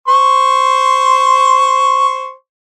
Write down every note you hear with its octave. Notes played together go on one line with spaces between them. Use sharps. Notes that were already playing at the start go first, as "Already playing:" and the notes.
C5 C6 C#6